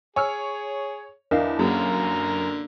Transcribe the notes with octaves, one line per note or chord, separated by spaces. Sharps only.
G#4 C#5 G#5 E6 F6
E2 D4 E4 A#4 D#5 F5
F#2 D3 A#3 C#4 F#4 G#4 A#4 A#5